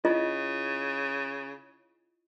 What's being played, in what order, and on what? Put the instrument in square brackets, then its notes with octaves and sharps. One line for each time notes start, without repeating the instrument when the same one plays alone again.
[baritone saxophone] C#3 [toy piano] E4 F4 D#5